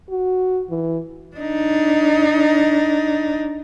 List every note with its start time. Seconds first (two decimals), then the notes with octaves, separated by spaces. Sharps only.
0.10 F#4
0.70 E3
1.36 D4 D#4